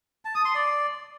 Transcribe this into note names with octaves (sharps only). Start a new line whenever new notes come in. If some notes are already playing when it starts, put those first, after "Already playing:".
A5
D#6
C6
D5